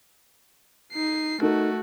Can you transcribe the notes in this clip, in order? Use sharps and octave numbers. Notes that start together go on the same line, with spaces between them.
D#4 C7
A3 D#4 F#4 A4 A#4